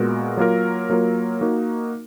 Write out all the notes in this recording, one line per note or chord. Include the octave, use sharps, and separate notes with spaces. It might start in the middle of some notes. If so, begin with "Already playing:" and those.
Already playing: A#2 G#3 B3 F#4 A#4
F#3 A#3 F4 A#4
F#3 A#3 F4 A#4
A#3 D#4 F#4 A#4